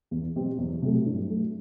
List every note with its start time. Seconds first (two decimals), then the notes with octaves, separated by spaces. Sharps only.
0.11 E2
0.36 B2 F#3 C4 G4
0.58 E2
0.82 C3 F#3 A3
1.06 G2
1.28 F#3 A3